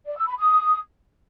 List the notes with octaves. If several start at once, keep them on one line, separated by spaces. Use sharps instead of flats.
D5
E6
B5
D#6